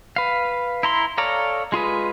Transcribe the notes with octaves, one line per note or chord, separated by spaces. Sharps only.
B4 F5
E4 A#5 C6
A4 C#5 D5 F5 A#5
G#3 F4 G#4 B4